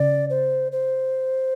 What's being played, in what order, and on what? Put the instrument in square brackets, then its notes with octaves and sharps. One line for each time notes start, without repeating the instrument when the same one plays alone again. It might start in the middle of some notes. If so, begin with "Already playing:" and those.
Already playing: [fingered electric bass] C#3 [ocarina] D5
[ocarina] C5
C5